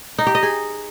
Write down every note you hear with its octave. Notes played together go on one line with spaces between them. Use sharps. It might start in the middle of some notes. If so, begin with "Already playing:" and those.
D#4
G4
D#5
G#4